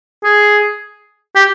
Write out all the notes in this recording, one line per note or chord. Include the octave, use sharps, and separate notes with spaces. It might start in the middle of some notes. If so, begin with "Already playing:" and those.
G#4
G4